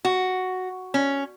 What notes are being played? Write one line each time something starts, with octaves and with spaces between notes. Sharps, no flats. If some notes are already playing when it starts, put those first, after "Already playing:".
F#4
C#4